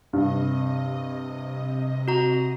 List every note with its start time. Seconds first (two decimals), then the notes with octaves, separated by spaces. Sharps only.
0.13 G2 C3 D#5
2.08 F#4 A#5